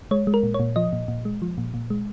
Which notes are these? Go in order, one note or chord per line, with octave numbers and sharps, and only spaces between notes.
G#3 C#5
G#3
A#4
A#2
C#5
A#2
F3 D#5
A#2
A#2
G#3
F3
A#2
A#2
G#3